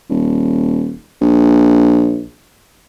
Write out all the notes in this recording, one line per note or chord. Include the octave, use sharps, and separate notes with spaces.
D#1
A#1